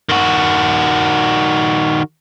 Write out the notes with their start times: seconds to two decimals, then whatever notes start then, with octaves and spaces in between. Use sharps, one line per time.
0.09 D#3 F#4